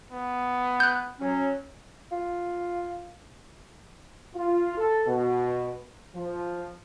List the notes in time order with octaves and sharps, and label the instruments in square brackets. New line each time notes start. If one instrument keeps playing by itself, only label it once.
[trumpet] B3
[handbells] F#6 G6
[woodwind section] F#3 C#4
[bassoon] F4
[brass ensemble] F4
A4
B2
F3